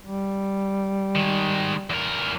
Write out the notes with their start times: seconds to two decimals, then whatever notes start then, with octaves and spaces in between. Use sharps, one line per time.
0.03 G3
1.15 D#3 G#3
1.90 E2 A#4